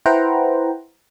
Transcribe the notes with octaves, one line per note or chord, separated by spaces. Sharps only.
E4 B4 C5 F#5 G5 A#5